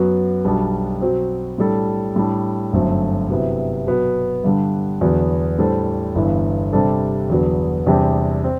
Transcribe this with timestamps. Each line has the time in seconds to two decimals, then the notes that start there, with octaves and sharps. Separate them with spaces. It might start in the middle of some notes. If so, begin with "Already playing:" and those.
Already playing: F#2 F#3 B3 F#4
0.45 B1 B2 G3 D4
1.01 B2 F#3 C4
1.58 A2 G3 D4 A4
2.16 A2 G3 D4
2.73 G1 F#2 F#3 A3 C4
3.30 C3 F#3 B3 E4
3.87 B2 F#3 B3
4.44 G2 D3 G3
5.01 E2 D3 F#3 B3
5.59 A2 G3 D4 A4 C5
6.15 G1 G2 E3 B3 E4
6.72 C3 G3 D4 A4 C5
7.30 E2 D3 F#3 B3
7.87 E2 C3 G3 D4 G4
8.44 C4